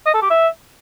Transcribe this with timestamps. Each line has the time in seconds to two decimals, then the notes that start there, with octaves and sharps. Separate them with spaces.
0.06 D#5
0.14 A4
0.22 G4
0.30 E5